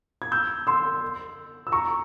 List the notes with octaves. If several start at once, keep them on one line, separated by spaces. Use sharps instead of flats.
G#6
E6 G6
C6 E6
E6
A#5 C#6